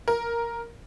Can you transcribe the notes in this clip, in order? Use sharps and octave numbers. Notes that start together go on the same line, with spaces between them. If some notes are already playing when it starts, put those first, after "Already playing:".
A#4